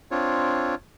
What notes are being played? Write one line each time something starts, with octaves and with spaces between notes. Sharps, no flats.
C4 D4 F4 C#5